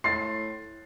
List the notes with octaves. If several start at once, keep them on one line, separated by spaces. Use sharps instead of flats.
A2 C6 A6 C7